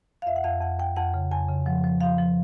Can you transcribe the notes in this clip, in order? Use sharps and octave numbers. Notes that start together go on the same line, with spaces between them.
F5
F2 E5
F#5
F2 F5
F2 F#5
F2 G5
F2 F#5
C#3
F2 G#5
C#3
F3 F#5
F3
F3 F5
F3